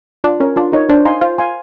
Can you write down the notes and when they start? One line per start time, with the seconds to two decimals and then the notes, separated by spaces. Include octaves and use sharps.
0.24 D4 F4
0.40 C#4 A#4 C#5
0.56 D4 F4
0.72 D#4 A#4 C#5
0.89 D4 C5
1.05 D#4 F5 G#5 C6
1.21 F4 C5
1.38 F5 G#5 C6